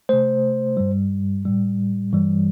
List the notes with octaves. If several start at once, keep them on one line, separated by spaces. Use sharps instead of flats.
C3 A3 C5
G2 G3
A2 G3
G2 E3 G3